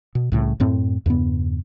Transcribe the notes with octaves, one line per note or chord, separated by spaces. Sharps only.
B2
C2 A2 C#3
F#2 A2 C4
E2 G2 C#3 B3